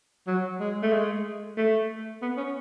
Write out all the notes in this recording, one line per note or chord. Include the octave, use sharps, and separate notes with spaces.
F#3
G#3
A3
G#3
A3
B3
C#4